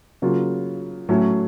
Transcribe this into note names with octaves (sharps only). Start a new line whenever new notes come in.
C#3 F#3 A#3 F4
A2 F#3 A3 C#4